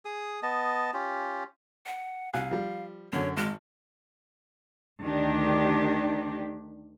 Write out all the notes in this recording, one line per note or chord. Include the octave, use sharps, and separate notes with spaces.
G#4 D#6
B3 D#5 A5
C#4 F4 G4
F#5
C2 F5 G#5 F#6
F3 G3
F#2 D3 C#5
G#1 G#3 F6
D2 D#3 D4 G4